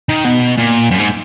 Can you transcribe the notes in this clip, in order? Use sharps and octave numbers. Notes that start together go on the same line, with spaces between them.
D#3
B2
A#2
F#2
G#2